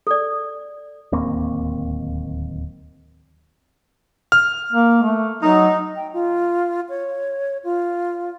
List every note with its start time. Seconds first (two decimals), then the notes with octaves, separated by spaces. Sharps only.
0.07 A4 D5
1.12 D1 D#2 A#3 C4
4.32 F6
4.72 A#3
5.03 A3
5.42 F#3 D#4
5.96 G5
6.13 F4
6.89 C#5
7.64 F4